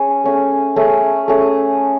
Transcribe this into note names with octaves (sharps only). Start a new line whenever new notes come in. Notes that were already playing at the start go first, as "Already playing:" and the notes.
Already playing: C#4 G#4
A3 C#4 G#4
A3 C#4 G#4
A3 C#4 G#4